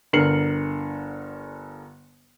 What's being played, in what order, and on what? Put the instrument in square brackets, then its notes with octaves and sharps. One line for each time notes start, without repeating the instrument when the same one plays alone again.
[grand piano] G1 D3 A#4 C7 C#7 F#7